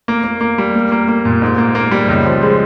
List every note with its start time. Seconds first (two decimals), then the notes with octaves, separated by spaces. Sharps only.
0.08 A#3
0.24 A#3
0.41 A#3
0.58 G3
0.75 A#3
0.92 A#3
1.08 A#3
1.25 A#2
1.42 G#2
1.58 A#3
1.75 A#3
1.91 G3
2.08 C#2
2.25 F3
2.43 G#3